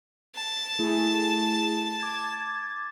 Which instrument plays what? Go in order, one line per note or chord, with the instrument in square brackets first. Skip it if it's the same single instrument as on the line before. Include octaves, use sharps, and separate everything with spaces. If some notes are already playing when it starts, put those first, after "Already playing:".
[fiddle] A5
[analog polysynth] A3 E4 G#4
D6 G#6 A6